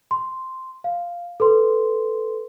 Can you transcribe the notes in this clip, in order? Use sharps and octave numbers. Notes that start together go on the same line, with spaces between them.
C6
F5
A4 B4 C6